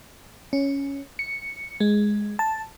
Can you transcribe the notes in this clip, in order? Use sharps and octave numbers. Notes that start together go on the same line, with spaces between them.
C#4
C#7
G#3
A5